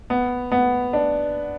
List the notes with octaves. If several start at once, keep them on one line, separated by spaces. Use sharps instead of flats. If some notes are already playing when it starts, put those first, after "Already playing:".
B3
B3
D4